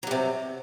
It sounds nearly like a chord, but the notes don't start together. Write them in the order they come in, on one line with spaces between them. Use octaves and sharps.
F#3 G2 C3